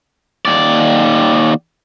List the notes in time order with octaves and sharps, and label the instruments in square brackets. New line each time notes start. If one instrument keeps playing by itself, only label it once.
[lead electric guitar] D#2 D5